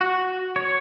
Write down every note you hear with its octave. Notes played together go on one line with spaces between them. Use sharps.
F#4
C#5